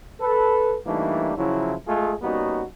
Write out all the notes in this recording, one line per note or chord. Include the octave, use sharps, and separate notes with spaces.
A4 B4
E3 G3 A3 A#3 D4 D#4
C#3 F3 F#3 E4
G#3 A3 F4 G#4
G3 A#3 B3 C#4 D#4 F#4